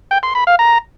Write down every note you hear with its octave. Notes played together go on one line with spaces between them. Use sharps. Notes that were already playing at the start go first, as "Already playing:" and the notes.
G5
C6
B5
F5
A#5